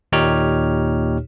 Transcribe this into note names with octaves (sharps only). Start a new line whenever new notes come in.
D#2 A#2 D#4 G4 C#5 F6